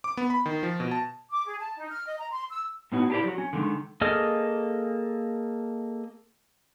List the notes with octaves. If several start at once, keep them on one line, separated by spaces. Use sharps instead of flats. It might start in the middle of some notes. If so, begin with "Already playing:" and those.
D6
B3
B5
D#3
F3
B2
A5
D6
G#4
A5
D#4
F6
D#5
A#5
C6
E6
A2 B3 C#4 D#4 F#4
D4 E4 G4 A4 C5 D5
F#3 F#4
C#4
D3 D#3 G3 G#3
A#3 G#4 A4 D#5 F6